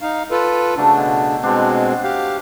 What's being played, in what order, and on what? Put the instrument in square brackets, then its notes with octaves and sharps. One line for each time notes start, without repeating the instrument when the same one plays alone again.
[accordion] D#4 F5
F4 A4 B4
[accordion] C#3 D4 [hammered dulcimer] F3 F#3 A3
[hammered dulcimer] B2
[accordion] B2 G#3 C4 [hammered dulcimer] B3 D4 C5
[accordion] G4 F5